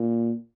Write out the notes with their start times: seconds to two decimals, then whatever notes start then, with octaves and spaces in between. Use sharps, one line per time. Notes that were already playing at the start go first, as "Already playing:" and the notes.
Already playing: A#2